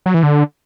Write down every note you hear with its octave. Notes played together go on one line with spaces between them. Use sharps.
F#3
E3
D3